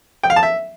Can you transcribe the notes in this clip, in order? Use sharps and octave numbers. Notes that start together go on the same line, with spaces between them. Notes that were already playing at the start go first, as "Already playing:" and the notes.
G5
F5
A5
E5